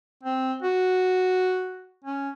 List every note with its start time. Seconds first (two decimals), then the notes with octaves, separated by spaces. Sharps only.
0.23 C4
0.62 F#4
2.04 C#4